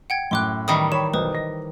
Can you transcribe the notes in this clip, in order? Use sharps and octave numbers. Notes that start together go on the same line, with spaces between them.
F#5 G5 G#6
F#2 A2 G5 C6 D6 F#6
D#3 E3 G3 C#6 D#6
C#5 B5 C#6 E7
B1 B4 C5 D#6
D#5 A#6